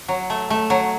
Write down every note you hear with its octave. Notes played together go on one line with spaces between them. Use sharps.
F#3
A3
A3
F#3